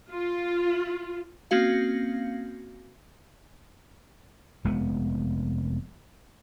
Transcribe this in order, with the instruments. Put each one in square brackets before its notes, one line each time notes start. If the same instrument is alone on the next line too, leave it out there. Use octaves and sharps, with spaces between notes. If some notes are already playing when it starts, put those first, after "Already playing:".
[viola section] F4
[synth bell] A#3 C4 C#4 F#4 F5
[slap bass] F1 G#3 B3